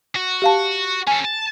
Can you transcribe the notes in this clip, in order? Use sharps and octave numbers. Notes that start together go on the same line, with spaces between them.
F#4
G4 F5 A5
C#4 A4 G#5
A5